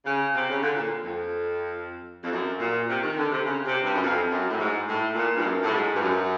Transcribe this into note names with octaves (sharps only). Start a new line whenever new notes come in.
C#3
C3
C#3
D3
A#2
F2
F2
F#2
A#2
C3
D#3
D3
C3
C#3
C3
G2
F#2
F2
F#2
A2
G#2
A2
A#2
G2
F#2
A2
G#2
G2
F#2